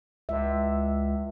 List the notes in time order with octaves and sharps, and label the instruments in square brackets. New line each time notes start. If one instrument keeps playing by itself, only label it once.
[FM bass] C#2 [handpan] E5